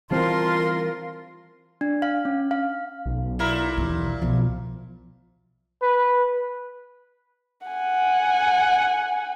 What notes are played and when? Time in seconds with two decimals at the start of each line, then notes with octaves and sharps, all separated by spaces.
0.11 E3 G3 C4 F4 A#4 F5 A5 C6
1.81 D4
2.02 F5
2.25 C#4
2.51 F5
3.06 B1
3.39 A#2 E4 A#4
3.77 D#2 E3
4.22 B1 F3
5.82 B4
7.67 F#5 G#5